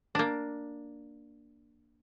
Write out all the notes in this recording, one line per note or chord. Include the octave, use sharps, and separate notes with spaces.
A#3 D4